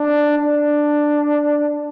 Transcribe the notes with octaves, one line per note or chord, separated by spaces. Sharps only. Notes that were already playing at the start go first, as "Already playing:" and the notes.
Already playing: D4
D4